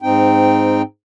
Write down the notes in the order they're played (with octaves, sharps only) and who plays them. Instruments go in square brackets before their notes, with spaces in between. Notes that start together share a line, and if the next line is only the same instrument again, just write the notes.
[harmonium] G#2 C4 D#4 G5